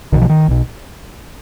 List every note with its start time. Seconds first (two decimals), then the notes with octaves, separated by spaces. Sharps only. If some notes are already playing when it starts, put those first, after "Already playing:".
0.12 B1 D#3
0.16 B2
0.21 F3
0.30 D#3
0.48 B1 B2